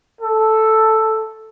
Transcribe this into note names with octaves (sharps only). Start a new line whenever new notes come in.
A4